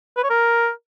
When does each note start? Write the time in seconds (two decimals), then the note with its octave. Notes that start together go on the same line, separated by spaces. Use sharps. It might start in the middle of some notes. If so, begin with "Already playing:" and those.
0.17 B4
0.24 C#5
0.30 A#4